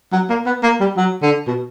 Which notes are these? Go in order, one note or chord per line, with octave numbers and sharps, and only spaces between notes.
F#3
A#3
B3
A#3
G3
F#3
D3
B2